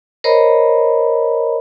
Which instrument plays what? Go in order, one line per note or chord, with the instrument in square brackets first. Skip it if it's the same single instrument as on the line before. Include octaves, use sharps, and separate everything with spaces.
[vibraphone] A#4 C5 C#5 D#5 A#5 B5